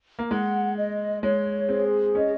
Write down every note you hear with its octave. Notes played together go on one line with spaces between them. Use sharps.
A#3
G#3 F#5
D#5
G#3 C#5
C4 G#4
C#4 D#5